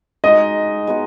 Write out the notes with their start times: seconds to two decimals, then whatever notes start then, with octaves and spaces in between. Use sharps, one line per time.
0.24 G#3 D#4 F#4 D#5
0.87 G#3 B3 D#4 F#4